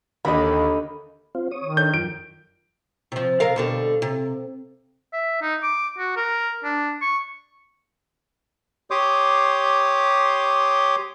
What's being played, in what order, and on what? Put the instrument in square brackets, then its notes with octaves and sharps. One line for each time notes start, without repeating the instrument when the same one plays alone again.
[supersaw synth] D#2 [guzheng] D3 A#3 [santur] D#5 B5
[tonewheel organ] C4 F4
C#5 D#6
[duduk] D#3
[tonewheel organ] D4 A4 C#5 [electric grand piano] G6
[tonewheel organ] F#2 F3 G5 [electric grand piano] D7
[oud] C3 F3
C3 A#4 F5
B2 D3 G3
C3
[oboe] E5
D#4
D6
F#4
A#4
D4
C#6
[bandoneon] G4 C#5 C6 D6 D#6 G6